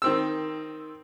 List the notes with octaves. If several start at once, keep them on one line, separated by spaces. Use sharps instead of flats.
D#3 C4 E6